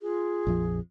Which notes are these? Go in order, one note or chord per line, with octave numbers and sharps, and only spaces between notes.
F4 G#4
A#1 F2 F3